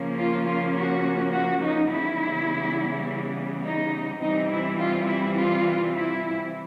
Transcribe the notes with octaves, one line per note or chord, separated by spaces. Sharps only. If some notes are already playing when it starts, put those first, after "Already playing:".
Already playing: C#3 F3 A#3 C#4
F4
F4
F#4
F#4
D#4
C#3 E3 G3 B3 E4
D#4
C3 E3 G3 C4 D#4
E4
F4
E4
F4
E4